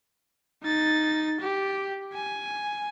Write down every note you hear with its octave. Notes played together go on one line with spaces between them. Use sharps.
D#4 A6
G4
G#5